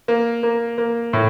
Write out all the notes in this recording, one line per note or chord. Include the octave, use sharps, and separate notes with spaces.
A#3
A#3
A#3
A2